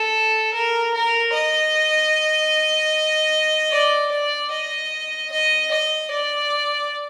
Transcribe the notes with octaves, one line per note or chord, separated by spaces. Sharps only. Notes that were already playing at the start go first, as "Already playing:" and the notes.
Already playing: A4
A#4
A#4
D#5
D5
D5
D#5
D#5
D#5
D5